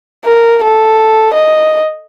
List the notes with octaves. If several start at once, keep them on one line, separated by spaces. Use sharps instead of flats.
A#4
A4
D#5